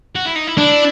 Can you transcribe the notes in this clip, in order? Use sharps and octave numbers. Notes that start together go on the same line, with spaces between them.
F#4
E4
D#4
E4
D4 E4